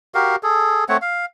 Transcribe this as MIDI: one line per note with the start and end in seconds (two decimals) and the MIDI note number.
0.15 0.36 66
0.15 0.36 67
0.15 0.36 70
0.15 0.36 77
0.43 0.84 68
0.43 0.84 69
0.89 0.97 57
0.89 0.97 60
0.89 0.97 73
0.89 0.97 78
1.02 1.26 77